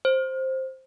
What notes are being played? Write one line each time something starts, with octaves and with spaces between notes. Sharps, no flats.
C5